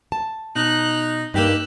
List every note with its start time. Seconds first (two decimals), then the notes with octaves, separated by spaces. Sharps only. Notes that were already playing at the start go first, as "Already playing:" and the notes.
0.12 A5
0.55 B2 D#4 F#6
1.34 G2 A#3 D#4 G4 E6 F#6